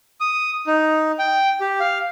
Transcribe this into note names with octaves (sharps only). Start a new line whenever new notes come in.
D#6
D#4
G5
G4
F5